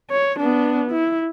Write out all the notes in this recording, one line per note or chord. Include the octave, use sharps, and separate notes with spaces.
C#5
B3 D4
E4